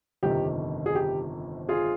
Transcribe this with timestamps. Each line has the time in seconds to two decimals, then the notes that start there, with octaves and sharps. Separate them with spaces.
0.23 G1 F2 C3 D#3 G4
0.86 G#4
0.95 G4
1.69 F4 G#4